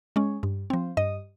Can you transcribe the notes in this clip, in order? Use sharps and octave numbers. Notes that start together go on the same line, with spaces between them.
G#3 C#4
G2
F3 C4
G2 D#5